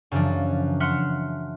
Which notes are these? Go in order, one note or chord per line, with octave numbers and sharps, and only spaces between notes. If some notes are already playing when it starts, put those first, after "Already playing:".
F#2 C#3 E3 F3 D4
E5 F#5 C6 F6 F#6 C#7